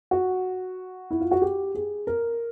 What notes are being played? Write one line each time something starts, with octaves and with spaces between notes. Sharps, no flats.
F#4
E4
F4
F#4
G4
G#4
A#4